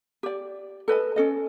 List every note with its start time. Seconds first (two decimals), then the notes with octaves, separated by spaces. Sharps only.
0.23 G4 D5
0.88 A4 B4 D#5 A5
1.16 C#4 A4 D#5